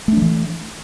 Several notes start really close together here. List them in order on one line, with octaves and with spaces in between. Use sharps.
A3 D4 F3 E3